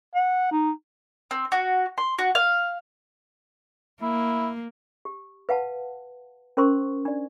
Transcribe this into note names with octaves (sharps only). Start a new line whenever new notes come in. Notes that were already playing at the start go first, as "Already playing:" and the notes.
F#5
D#4
C4
F#4
C6
F#4
F5
A#3 E4
G4
B4 F5 F#5 A5
C#4 A#4 C5 C6 C#6
D4 D5